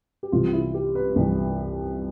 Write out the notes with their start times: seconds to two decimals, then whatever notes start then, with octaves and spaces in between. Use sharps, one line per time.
0.23 G4
0.32 C2 C3 E3 F4
0.53 E4
0.74 G4
0.95 B4
1.16 C2 C3 E3